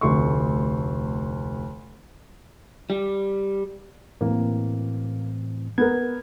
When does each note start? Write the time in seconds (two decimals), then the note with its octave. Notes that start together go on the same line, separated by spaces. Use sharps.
0.01 F1 D2 C6 C#6
2.90 G3
4.21 A2 E3 A#3 C4
5.78 B3 A#4 G#6